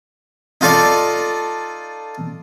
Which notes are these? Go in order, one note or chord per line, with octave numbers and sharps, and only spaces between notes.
D#4 F4 A4 D5